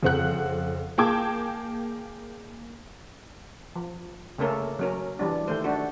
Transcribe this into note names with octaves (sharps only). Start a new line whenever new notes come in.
F2 C#3 C4 F#5 F#6
A#3 G#4 G5 A5 D6 G#6
F3
C#3 A3 A#3 C#4 A4 A#4
F#3 C#4 A#4
E3 G3 D4
D#3 A3 C5
D4 F#4